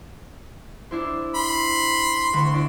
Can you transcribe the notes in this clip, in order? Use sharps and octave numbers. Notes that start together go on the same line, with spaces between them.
D4 E4 C5
B5 C6
D2 C#6
D4 E4 D5